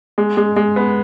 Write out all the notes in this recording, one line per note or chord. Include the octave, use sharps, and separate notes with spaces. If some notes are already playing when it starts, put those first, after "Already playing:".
G#3
G#3
G#3
B3